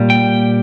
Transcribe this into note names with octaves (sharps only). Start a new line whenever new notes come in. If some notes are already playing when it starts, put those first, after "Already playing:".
Already playing: A#2 G3
G5